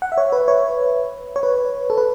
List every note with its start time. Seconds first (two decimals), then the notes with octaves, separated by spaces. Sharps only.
0.02 F#5
0.12 E5
0.18 C#5
0.32 B4
0.48 C#5
1.36 C#5
1.43 B4
1.90 A4
1.98 B4